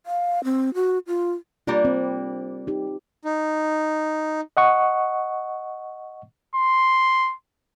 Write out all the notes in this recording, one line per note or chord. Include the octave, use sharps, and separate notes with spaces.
F5
C4
F#4
F4
G3 A#3 D4 F4
C4
D#4 G4
D#4
D#5 F#5 C#6
C6